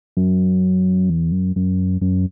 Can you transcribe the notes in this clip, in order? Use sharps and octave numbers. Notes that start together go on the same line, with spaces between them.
F#2
E2
F#2
F#2
F#2